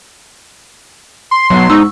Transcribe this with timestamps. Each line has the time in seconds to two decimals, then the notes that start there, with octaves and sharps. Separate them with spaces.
1.31 C6
1.50 B1 B2 F#3
1.70 G#2 D#4 C#6 E6